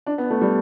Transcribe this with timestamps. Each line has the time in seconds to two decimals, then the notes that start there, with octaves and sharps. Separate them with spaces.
0.06 D4
0.18 B3
0.30 A3
0.41 G3